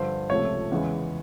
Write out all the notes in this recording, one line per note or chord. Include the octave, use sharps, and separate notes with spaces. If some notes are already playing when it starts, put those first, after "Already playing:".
Already playing: G2 D3 F3 C5
C#2 C3 F3 A3 C#5
E2 C#3 E3 G#3